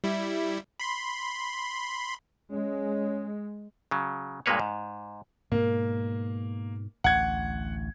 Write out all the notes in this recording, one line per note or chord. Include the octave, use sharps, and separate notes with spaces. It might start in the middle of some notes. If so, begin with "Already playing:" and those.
G3 E4
B5 C6
G#3 C#4
C#3 F#3
G2 A#2 G#3 A#3 B4 C#5
G#2
G#2 B2 A#3
A1 D2 F#5 G#6